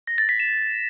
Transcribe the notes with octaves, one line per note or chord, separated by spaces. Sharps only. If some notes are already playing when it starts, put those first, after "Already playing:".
A#6
A6
B6
E7